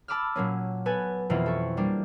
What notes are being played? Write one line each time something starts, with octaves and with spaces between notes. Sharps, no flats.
A5 B5 D6 E6 F6
A#2 F#3 A#3 C#4
B3 A4 B4 G#5
F2 B2 E3 A#3 E4 F4
A4 C#6
G3 A#3 D4